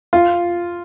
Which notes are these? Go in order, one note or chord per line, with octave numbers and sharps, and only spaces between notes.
F4